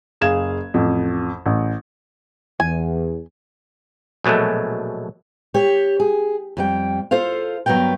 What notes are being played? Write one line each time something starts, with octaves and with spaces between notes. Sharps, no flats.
F#1 G#4 F5 G#6 E7
A1 F2
A1
E2 G#5
A#1 B2 F#3 G#3 A3
G4 C#5
G#4
F2 G3 G5
F4 A4 C5 F5
G2 F#3 A#3 B3 A#4 G5